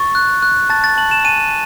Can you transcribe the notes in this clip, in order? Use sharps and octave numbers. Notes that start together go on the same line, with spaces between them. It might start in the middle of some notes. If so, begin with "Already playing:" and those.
Already playing: C#6 A6
F#6
F#6
A5 A6
A6
A5 F#7
E7
G#5 D#7